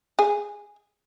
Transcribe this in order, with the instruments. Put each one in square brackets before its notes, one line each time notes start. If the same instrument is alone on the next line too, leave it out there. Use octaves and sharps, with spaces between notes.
[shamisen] G#4